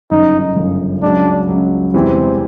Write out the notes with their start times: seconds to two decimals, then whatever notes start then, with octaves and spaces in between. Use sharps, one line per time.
0.11 G1 F#2 C#3 D#4
0.56 G1 F#2 C#3
1.02 C#2 C#3 F#3 D4
1.48 C#2 C#3 F#3
1.94 E1 E2 C3 E3 G3 C4